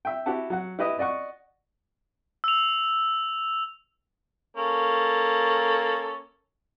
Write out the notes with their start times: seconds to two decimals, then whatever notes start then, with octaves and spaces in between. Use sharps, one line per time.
0.05 E5 G5
0.26 E4 F#4 G4 F#5 A5
0.50 F#3 F#5
0.79 E4 G4 B4 D#5 D#6
0.99 D5 D#5 F#5 C#6
2.44 E6 F7
4.57 A#3 C#4 A4